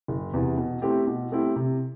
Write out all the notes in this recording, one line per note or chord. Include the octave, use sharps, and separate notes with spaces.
F#1
E2 C3 E3
B2
A3 C4 E4 G4
B2
A3 C4 E4 G4
C3